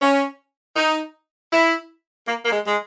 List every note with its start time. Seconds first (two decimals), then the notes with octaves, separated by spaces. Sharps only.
0.01 C#4
0.76 D#4
1.52 E4
2.26 A#3
2.45 A#3
2.51 G#3
2.66 G#3